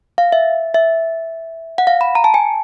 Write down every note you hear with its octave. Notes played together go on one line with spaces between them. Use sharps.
F5
E5
E5
F#5
F5
B5
A#5
A5
G#5